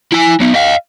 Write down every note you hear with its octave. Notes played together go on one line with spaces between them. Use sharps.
E4 G#5
F#3 B3
D#5 F5